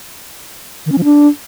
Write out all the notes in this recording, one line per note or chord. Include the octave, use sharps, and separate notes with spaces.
D#3
C#4
F3
D4